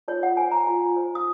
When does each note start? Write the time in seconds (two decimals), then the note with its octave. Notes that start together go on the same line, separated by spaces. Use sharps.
0.08 F4 C#5
0.23 F#5
0.37 C5 G#5
0.52 A#5
0.67 F4
0.96 C5
1.15 D#6